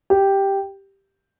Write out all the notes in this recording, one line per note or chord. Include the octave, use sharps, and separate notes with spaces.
G4